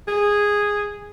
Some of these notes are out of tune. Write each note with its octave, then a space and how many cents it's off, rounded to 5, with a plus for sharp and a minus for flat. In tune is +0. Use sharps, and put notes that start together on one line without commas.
G#4 -10